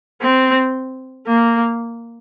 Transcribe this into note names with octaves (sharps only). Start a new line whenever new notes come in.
C4
A#3